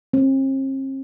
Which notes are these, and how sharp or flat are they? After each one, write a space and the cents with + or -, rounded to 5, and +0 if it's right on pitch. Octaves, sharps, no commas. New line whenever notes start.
C4 +45